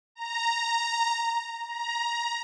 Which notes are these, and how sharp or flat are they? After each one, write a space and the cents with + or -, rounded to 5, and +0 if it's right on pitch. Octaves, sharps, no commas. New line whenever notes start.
A#5 -5
A#5 +15